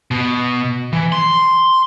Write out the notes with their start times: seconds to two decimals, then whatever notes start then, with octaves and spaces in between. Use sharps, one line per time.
0.11 B2
0.93 E3
1.12 C6